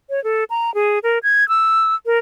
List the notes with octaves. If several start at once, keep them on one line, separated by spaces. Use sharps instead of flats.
C#5
A4
A#5
G#4
A#4
G#6
E6
A#4